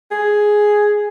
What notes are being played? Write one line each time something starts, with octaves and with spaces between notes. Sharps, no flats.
G#4